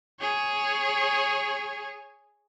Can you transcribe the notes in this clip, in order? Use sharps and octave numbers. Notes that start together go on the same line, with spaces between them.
G#4 C#5